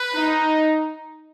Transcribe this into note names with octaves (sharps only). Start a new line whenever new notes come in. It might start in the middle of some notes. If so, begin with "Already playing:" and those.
Already playing: B4
D#4